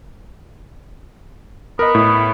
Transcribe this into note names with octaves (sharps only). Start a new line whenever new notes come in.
B3 A#4 D#5
A2